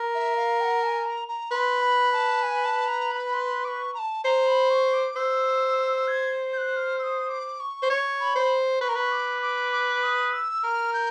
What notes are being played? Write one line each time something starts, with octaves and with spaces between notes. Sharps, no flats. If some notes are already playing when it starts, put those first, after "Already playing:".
Already playing: A#4
E5
F5
G5
F#5
A5
G#5
A#5
A#5
B4 C6
B5
A5
G#5
A5
A#5
B5
B5
C6
D6
C#6
A#5
A5
C5 A#5
B5
C#6
D6
C5 E6
G#6
G6
F#6
F6
E6
D#6
D6
C#6
C5
C#5
B5
C5
B4 C#6
A#4
B4
D6
D6
D6
D#6
E6
A#4 F6
G6